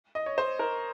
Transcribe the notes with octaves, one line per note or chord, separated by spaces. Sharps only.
D#5
C#5
C5
A#4